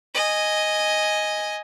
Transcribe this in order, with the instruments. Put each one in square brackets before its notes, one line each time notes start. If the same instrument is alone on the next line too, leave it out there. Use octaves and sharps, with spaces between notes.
[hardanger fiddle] D#5 G#5